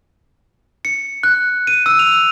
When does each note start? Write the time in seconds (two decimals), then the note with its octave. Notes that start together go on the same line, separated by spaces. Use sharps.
0.85 C#7
1.23 F#6
1.67 D#7
1.86 E6
1.99 F7